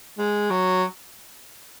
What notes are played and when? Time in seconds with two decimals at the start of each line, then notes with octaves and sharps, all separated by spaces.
0.18 G#3
0.50 F#3